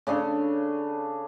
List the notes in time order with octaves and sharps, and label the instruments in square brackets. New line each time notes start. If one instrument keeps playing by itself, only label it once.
[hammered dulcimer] C#3 D4 G#4 A4